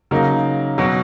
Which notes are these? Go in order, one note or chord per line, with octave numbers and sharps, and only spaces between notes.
C#3 F#3 A#3 D#4
B2 F#3